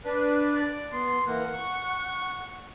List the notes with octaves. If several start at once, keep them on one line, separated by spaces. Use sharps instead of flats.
D4 B4
D5
B3 C6
E3 A#3 F#5
C#6